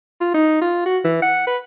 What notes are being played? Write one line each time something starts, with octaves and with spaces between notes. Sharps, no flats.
F4
D#4
F4
F#4
E3
F#5
B4